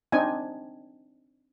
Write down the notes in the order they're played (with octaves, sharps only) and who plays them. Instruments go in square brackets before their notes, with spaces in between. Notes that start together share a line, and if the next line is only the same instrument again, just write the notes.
[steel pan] C4 D4 D#4 G#5